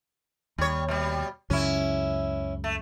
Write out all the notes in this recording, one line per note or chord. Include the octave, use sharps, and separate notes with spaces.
D#2 G3 C#5
B2 G3
C#2 F#2 C#3 C#4 E4
A3